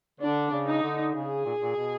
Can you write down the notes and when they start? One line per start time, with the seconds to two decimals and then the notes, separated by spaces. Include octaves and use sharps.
0.20 D3 D4
0.51 C#3
0.67 D#4
0.83 D3
1.14 C#3 G#4
1.45 A#2
1.62 A#2
1.76 B2